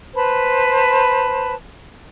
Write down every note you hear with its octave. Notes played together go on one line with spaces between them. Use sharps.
B4 C5 A5 B5